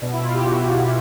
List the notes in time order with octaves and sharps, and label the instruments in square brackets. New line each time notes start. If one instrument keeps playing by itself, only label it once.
[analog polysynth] B2 D4
E4
F4
G4
F#4